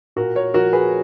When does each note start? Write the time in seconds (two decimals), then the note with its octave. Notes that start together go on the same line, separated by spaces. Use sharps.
0.16 A#2 F#4 A#4
0.36 A#4 C#5
0.54 F3 F#4 A#4
0.73 G#4 B4